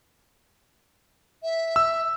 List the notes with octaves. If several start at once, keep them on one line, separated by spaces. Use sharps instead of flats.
E5
E6